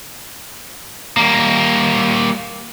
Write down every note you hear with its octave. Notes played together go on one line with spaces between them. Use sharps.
G3 A#3